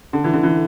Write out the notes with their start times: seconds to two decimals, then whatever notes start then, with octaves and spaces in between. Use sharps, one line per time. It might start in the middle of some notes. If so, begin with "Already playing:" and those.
0.13 D3
0.24 E3
0.33 D3
0.43 E3